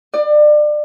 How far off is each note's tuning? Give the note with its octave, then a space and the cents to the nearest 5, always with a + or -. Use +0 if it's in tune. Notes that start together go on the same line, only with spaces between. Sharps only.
D5 +30